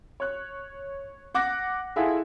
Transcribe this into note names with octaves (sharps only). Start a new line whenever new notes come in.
C#5 F#6
F#5 D6 F#6 A#6
E4 F4 G#4 A4 E5 F#5